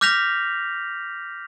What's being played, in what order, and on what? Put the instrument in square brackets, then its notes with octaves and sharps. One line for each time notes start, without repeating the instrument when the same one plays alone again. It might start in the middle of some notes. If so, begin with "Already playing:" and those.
[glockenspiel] D6 F6 G6 A#6 B6 F7